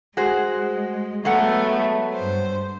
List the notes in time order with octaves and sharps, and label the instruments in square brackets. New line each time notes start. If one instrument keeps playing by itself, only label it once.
[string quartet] G#3 [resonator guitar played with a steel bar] F#4 G#4 C5
[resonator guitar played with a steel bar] F#3 A4 F#5 [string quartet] G#3 A3 B3
[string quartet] G2 C5